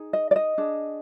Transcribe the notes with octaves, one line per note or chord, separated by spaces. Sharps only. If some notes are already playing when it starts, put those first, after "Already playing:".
Already playing: D#4 G#4
D#5
D5
D#5
D4 G#4